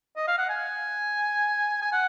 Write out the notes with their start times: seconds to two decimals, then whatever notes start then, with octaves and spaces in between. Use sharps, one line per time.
0.16 D#5
0.28 F5
0.38 F#5
0.49 G#5
1.82 G#5
1.93 F#5